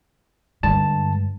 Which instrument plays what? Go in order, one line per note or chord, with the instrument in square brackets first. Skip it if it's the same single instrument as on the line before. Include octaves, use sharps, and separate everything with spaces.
[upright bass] G2 [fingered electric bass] D3 G#3 [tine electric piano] A5